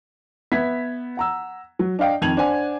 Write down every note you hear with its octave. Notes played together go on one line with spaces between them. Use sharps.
B3 E5 G#6 B6
F#5 A#5 E6
F#3
D4 D#5 F5 G5
F2 D#3 G#6 D#7 F7 F#7
D4 C5 F#5 G#5